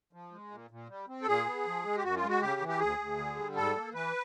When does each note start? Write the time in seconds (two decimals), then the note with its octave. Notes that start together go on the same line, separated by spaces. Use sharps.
0.13 F3
0.32 G#3
0.51 A#2
0.71 A#2
0.89 G3
1.09 C4
1.22 A4
1.27 A#2 G#4
1.46 B3
1.65 F3
1.85 G#3
1.97 G4
2.04 F#2 F#4
2.16 F4
2.23 G#3
2.29 F#4
2.41 C#3 G4
2.61 E3
2.68 G4
2.79 D2 G#4
2.99 D2
3.18 D3
3.37 G3
3.55 G#2 A4
3.75 A#3
3.94 E3 B4